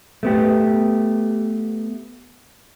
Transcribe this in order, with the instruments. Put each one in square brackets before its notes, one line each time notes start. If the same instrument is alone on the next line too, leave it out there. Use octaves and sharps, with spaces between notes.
[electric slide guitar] A3 B3 G4